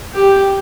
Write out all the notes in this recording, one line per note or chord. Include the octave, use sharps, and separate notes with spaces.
G4